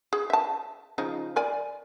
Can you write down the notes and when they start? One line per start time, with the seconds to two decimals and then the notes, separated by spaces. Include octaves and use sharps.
0.13 G#4
0.30 E5 A5
0.98 C#3 F3 D#4
1.36 A#4 D5 G#5